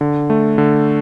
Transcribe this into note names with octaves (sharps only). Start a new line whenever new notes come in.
D3
A3
D3